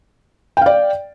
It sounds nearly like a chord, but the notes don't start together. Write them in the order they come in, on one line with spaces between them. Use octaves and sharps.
G5 F5 D5